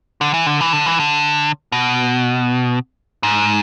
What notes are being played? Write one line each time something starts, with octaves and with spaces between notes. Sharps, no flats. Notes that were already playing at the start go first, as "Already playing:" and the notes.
D3
E3
D3
E3
D3
E3
D3
B2
G#2